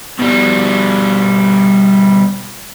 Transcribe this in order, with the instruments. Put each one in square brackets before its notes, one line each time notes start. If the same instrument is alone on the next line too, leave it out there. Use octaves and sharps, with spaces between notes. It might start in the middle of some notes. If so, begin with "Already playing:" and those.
[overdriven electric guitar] B2 G3